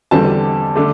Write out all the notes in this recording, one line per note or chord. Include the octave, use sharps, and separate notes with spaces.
E2 D3 G3 C4 A5
D3 A3 D4